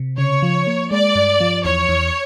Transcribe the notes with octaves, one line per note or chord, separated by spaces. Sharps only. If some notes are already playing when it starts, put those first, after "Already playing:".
Already playing: C3
C#3 C#5
F3
A#3
G#3 D5
G2
F3
E2 C#5
E2